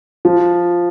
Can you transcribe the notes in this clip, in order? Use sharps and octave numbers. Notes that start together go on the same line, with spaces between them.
F3